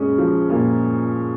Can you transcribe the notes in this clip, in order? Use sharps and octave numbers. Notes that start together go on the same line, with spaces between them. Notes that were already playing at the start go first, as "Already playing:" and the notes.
Already playing: A#2 G#3 C#4
F3
A#2